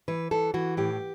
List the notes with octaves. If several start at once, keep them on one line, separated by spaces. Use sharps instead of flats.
E3 B4
E3 A4
E3 F#4
A2 G4